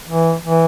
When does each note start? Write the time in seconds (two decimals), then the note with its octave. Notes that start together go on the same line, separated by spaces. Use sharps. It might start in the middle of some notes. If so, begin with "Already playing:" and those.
0.09 E3
0.45 E3